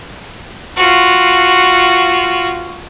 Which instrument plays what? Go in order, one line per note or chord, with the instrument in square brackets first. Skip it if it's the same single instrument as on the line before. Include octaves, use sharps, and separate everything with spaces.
[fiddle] F4 F#4